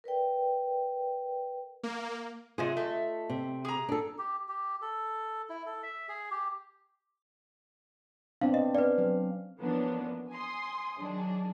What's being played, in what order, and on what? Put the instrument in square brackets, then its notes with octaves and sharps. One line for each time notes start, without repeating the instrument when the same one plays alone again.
[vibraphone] A#4 B4 D5 G5
[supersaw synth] A#3
[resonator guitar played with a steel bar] C3 F#3 G#4 [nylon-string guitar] F4 D#5
[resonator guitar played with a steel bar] A3
[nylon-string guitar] C3
[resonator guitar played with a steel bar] G#4 A#5
[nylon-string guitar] D4 A4
[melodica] G4
G4
A4
E4
A4
E5
G#4
G4
[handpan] B3 C4 D4 [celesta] F5
[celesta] D#5
[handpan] C#4 F5 [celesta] B4 D5
[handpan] F#3
[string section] E3 F3 A#3 B3 C#4 D4
G#5 C6 D#6
D#3 F#3 D4 G#4